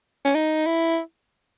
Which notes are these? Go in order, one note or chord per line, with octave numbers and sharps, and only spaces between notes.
C#4
D#4
E4